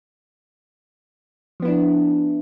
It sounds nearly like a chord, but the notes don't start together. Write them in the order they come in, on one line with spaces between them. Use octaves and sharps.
F3 B3 E4 D4